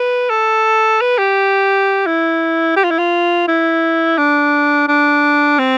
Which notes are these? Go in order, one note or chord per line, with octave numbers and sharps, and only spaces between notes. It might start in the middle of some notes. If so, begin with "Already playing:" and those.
Already playing: B4
A4
B4
G4
E4
G4
F4
E4
F4
E4
D4
D4
C4